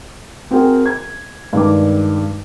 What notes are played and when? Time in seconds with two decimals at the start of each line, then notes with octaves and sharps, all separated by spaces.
0.51 C4 F#4 G#4 A#4 G5
0.86 G#6
1.53 G2 D#3 G#3 D4 D6